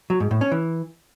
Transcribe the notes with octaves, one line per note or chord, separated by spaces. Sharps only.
F#3
G#2
A2
C#4
E3